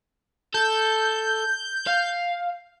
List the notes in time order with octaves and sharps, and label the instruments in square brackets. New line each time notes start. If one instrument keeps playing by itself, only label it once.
[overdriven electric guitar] A4 [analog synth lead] G6
[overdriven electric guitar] F5